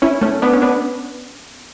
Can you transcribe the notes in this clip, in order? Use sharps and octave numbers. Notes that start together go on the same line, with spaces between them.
C#4 E4
A3 C#4
B3 D4
C#4
B3 D4